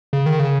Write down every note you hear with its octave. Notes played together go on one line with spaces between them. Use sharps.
C#3
D#3
C#3